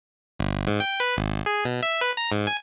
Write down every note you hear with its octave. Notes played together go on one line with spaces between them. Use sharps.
G1
G#2
G5
B4
G#1
G#4
B2
E5
B4
A#5
G#2
G#5